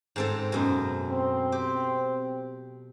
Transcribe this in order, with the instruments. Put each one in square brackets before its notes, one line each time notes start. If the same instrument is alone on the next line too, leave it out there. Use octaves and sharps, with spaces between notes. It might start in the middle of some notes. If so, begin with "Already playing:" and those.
[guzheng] G#2 C4 A4
F#2 B2
[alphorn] C4
[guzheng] G4